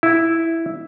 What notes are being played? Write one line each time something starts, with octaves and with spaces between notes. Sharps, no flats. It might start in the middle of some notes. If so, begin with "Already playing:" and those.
E4